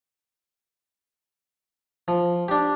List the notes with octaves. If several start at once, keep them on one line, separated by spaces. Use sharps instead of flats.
F3
D4 G4